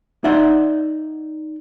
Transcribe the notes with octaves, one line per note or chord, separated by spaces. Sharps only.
D#4 D5 E5 F#5 C6